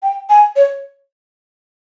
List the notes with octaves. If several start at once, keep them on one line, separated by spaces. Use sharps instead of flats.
G5
G#5
C#5